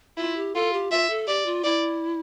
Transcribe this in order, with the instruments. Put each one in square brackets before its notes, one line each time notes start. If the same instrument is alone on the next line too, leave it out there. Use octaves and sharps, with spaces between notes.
[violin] E4 [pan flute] F4
[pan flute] G4
[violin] F4 [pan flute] A4
[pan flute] G4
[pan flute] F4 [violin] E5
[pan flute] A4
[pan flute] G4 [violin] D5
[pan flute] F4
[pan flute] E4 [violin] D5